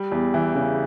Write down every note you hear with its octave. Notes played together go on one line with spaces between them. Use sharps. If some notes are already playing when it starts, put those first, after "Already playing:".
Already playing: G3
E2
E3
C#3